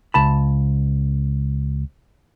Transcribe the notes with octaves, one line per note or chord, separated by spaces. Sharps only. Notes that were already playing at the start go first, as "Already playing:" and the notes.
C#2 A5 B5